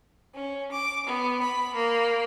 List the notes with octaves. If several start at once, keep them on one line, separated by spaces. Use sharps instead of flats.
C#4
D6
B3
B5
A#3